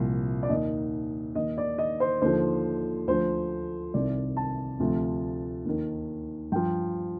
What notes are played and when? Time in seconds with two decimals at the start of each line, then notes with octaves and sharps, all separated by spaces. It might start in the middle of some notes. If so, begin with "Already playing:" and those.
Already playing: C2 A#2 F3
0.43 D5
0.49 D#2 D#3 D#5
1.35 D#2 D#3 D#5
1.58 D5
1.78 D#5
2.00 C5
2.22 D#2 D3 F3 C5
3.08 D2 D3 F3 C5
3.94 C2 C3 D#3 D5
4.37 A5
4.80 D2 C3 F3
5.65 D#2 D#3
6.52 G2 F3 G5